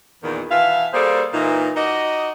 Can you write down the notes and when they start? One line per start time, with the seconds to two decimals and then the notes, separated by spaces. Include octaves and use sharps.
0.23 E2 A#2 D#3
0.51 B2 E3 E5 F5
0.94 G3 A#3 G#4 A4 C5 D5
1.34 A#2 E3 D#4
1.76 D#4 F#4 D5 D#5